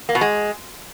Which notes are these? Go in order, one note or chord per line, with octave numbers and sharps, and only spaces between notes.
A#3
B2
G#3